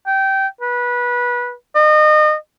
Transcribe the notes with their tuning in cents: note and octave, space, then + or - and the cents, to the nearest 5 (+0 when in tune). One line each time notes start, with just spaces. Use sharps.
G5 -20
B4 -20
D#5 -30